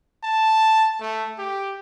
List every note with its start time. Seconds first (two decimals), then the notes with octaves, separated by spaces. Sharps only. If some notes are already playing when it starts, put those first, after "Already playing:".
0.23 A5
1.01 A3
1.38 G4